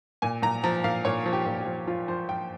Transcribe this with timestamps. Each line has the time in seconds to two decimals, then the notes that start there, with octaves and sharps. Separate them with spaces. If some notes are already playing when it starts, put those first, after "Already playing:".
0.22 A#2 G#5
0.42 A#2 A#5
0.64 F3 A#5
0.84 A#2 F5
1.05 A#2 C#5
1.26 F3
1.33 G4
1.46 A#2
1.60 G4
1.66 F3
1.87 F3 F4
2.08 F3 C5
2.29 F3 G5